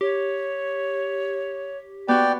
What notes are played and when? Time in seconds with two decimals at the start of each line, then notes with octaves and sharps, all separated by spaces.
0.01 G4 C#5
2.08 B3 F#4 D5 G5